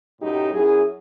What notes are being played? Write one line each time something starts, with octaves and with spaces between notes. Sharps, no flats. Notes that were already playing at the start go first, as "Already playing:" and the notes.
F#2 A2 F#3 D#4 G4
F#2 F#3 E4 G#4